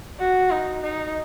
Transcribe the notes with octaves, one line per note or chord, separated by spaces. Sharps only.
F#4
D#4
D#4